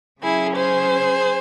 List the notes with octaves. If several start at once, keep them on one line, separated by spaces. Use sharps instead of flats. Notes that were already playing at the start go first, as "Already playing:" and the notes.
C#3 F#3 C#4 E4 G#4
G#4 C5